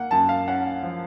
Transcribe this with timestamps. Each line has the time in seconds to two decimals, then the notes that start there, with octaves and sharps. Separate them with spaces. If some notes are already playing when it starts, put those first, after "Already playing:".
Already playing: A#3 F#5
0.11 F#2 A5
0.29 F5
0.48 C#4 F#5
0.83 F3